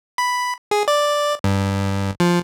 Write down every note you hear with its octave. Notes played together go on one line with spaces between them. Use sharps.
B5
G#4
D5
G2
F3